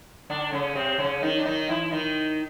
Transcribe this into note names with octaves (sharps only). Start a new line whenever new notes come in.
D3 D4
C#3 C#4
C3 C4
C#3 C#4
D#3 D#4
D4
D#3 D#4
E3 E4
D#3 D#4